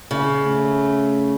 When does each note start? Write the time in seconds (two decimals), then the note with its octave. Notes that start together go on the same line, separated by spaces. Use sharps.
0.11 C#3
0.44 A3